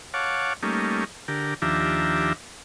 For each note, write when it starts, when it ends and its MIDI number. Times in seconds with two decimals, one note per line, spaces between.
0.14 0.53 73
0.14 0.53 77
0.14 0.53 78
0.14 0.53 81
0.14 0.53 86
0.63 1.04 55
0.63 1.04 57
0.63 1.04 58
0.63 1.04 61
0.63 1.04 63
1.28 1.54 50
1.28 1.54 67
1.28 1.54 70
1.62 2.33 39
1.62 2.33 53
1.62 2.33 62
1.62 2.33 67
1.62 2.33 76
1.62 2.33 82